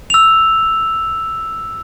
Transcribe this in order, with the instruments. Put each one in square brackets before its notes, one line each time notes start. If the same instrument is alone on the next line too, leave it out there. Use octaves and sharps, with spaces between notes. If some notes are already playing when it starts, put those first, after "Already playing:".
[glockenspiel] E6 F7